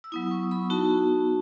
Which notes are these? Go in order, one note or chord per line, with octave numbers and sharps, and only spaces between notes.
E6
F#3 B3 E4 D#6
C#6
B5
B3 D#4 F#4 A5